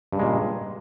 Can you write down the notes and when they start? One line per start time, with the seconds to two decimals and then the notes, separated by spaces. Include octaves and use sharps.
0.12 G2
0.16 C#3
0.19 G#3
0.23 A#2